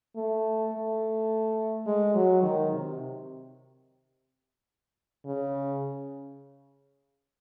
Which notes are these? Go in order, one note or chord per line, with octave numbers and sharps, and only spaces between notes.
A3
A3
G#3
F#3
D#3
C3
C#3